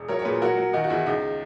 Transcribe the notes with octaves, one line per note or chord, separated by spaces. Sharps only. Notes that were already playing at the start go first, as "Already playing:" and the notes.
Already playing: E1
F#3 A#4 C#5
C#5
A#2 G#4 B4
F#3 F#4 A#4
F#3
D#3 D#4 F#4
F#4
E2 E4
C#2 D#4